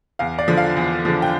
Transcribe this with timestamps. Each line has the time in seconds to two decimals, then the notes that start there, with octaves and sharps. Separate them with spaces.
0.19 E2 F5
0.39 D5
0.48 D3 F3
0.57 F5
0.77 E2
1.05 D3 F3
1.22 G5